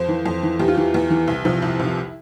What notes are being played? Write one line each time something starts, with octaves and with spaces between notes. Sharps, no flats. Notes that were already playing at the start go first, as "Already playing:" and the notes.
Already playing: F2 C5
E3
F2
E3
E2 G4
F4
E3 G4
E2
E3
C2
C3 F3
C2 E4
C3 F3